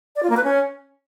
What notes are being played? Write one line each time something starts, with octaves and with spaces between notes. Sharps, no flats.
D5
F4
A#3
B4
C#4